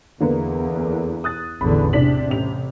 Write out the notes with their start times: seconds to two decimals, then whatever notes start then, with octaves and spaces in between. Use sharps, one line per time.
0.20 E2 D3 A#3 B3
1.24 D#6 F#6 A6
1.61 A1 E2 D3 B5
1.93 C3 D4 B6 F#7
2.30 A1 F7